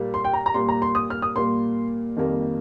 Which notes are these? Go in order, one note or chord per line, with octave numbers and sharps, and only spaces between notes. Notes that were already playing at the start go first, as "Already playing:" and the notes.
Already playing: A#2 G3 A#3
C6
G5
A#5
A#5
A#2 G3 A#3 C6
A#5
C6
D#6
F6
D#6
A#2 G3 A#3 C6
F2 D#3 G3 A#3